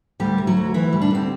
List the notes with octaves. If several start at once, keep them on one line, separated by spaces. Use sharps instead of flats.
D2 G3 G4
D2
F#3 F#4
D2
D2 E3 E4
G3
D4
D2 C4